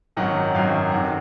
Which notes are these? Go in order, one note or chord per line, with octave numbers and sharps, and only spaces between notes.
G#1 F#2 D#3 F#3 F#5
G#1 F#2 D#3 F#3 F5
F2 C3 D#3 F#5